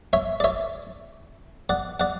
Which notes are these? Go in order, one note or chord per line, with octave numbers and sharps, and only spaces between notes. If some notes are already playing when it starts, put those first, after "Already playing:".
C#5 E5
D5
C#5 E5
D5 F#5
D5 F#5